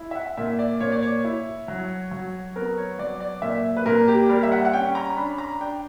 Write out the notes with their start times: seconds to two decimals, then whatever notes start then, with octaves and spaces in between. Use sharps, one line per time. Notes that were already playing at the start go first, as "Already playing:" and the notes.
Already playing: E4
0.11 E5
0.15 F#5
0.37 A#2 E5
0.59 D5
0.80 A#2 C#5
0.92 D5
1.02 C#5
1.24 E4
1.68 F#3
2.11 F#3
2.56 B3 A#4
2.78 C#5
2.99 F#3 D5
3.20 D5
3.42 A#2 E5
3.77 B4
3.86 A#2 A#4
4.08 G4
4.29 G3 A#4
4.43 E5
4.52 F#5
4.65 F#5
4.73 C#4 G5
4.95 A#5
5.17 D4 B5
5.38 A#5
5.61 D4 G5